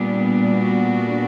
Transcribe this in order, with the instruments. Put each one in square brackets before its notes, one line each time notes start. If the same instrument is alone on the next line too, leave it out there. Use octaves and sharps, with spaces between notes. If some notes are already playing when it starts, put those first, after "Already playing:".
Already playing: [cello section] A#2 G3 B3 D4
F#4